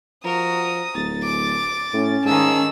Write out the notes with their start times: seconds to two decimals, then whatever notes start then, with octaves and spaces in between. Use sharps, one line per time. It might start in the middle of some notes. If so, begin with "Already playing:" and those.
0.25 F3 F#4 A#4 D#6
0.94 D1 A6
1.23 D6
1.94 A2 C#4
2.25 G#2 D#3 A#3 G#4 A5 E6